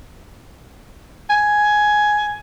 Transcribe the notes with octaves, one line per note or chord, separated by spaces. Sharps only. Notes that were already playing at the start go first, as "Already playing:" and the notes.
G#5